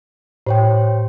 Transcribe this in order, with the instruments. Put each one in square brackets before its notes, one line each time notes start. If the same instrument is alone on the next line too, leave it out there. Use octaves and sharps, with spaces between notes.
[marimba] A2 [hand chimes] C5 C#5 G5